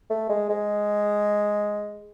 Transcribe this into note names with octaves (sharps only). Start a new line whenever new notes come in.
A3
G#3
G#3